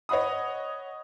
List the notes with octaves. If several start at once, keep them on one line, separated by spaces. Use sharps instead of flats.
C#5 D#5 F#5 B5 D#6